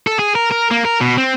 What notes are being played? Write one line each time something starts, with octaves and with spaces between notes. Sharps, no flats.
A4
G#4
A#4
A#4
A#3
A#4
B2
C4